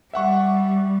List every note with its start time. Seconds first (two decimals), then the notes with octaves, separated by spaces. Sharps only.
0.13 G3 E5 F#5 C#6